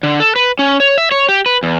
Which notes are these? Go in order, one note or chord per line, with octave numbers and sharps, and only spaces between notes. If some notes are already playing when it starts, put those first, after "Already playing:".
D3
A4
B4
C#4
C#5
E5
C#5
G4
B4
E2